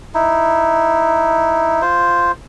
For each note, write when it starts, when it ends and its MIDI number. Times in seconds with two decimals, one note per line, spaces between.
0.14 1.82 63
0.14 1.82 64
1.82 2.32 65
1.82 2.32 72